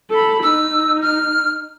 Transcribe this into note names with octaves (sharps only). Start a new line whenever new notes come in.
A4 B5
D#4 E6
F6